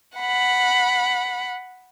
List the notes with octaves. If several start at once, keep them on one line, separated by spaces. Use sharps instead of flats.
F#5 B5